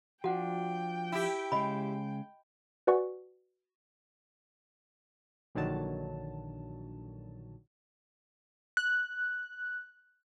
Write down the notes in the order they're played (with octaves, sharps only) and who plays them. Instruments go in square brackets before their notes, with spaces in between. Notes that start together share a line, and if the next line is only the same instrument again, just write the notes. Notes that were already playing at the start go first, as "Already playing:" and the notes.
[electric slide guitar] F3 D4 [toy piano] F#4 F#5 [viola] G5
[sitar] E4 G4
[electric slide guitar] C#3 G#3 [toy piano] D#5 B5
[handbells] F#4 B4 D5 F#5 G#5 C#6
[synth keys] A#1 D3 D#3 F#3 A5
F#6